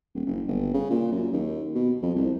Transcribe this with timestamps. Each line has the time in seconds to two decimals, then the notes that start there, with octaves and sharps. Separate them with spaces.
0.14 D#1
0.26 F#1
0.47 G1
0.74 C#3
0.90 A#2
1.12 F#2
1.33 D#2
1.75 B2
2.02 F2
2.15 C2